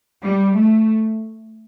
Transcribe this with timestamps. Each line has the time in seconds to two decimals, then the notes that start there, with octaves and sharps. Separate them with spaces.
0.23 G3
0.55 A3